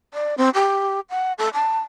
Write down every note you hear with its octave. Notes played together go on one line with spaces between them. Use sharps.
D5
C4
G4
F#5
A4
A5